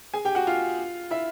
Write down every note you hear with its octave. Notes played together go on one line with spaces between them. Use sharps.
G#4 G#5
G4 G5
F#4 F#5
F4 F5
E4 E5